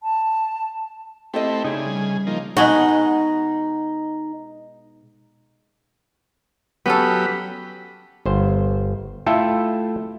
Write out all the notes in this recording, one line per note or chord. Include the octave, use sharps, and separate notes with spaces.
A5
A3 C4 E4 G4 A4 D#5
C#3 D#4 E4 G#4 D5
G3
F3 A#3 D#4
B2 G#3 D#4 F#4
F#3 B3 C#4 G4 A4 B5
G1 C5
A3 E4 F4 A4 G5